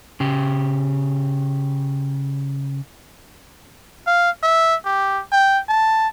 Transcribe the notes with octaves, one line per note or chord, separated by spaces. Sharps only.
C#3 G4
F5
E5
G4
G5
A5